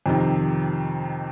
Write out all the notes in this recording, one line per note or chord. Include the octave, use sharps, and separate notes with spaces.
F2 C3 D#3